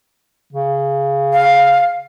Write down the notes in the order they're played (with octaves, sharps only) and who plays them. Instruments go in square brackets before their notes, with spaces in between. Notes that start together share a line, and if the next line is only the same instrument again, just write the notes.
[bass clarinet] C#3
[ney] F5